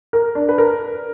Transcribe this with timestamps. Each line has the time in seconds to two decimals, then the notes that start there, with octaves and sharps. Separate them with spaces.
0.13 A#4
0.35 D4
0.49 B4
0.58 A#4